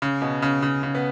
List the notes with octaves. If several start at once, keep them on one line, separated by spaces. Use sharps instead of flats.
C#3
B2
C#3
C#3
C#3
B3